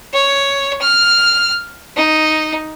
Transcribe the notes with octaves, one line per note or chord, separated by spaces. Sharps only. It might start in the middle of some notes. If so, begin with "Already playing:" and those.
C#5
F6
D#4